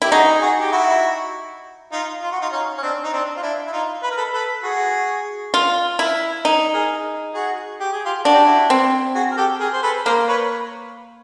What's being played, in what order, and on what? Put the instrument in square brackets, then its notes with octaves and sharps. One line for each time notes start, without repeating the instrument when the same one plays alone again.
[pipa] E4 [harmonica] G4
[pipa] D#4 [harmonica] F#4 G#4
[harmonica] F#4 G#4
G4
E4 F#4
D#4 F4
F4
F#4
D#4 F4
C#4 D#4
C#4
C4 D4
D#4
C4 D4
F4
D4 E4
E4
D#4 F4
B4
A#4
A4 B4
A4 B4
F#4 G#4
[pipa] F4
E4
D#4
[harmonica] G#4 A#4
F#4 G#4
G4
G#4
F4 G4
[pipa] D4 [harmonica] F#4
[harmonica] G4
E4 F#4
[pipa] C4
[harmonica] F#4 G#4
A#4
G4 A4
G#4 A#4
C5
A4 B4
[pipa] A#3 [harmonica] A#4 C5
[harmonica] B4 C#5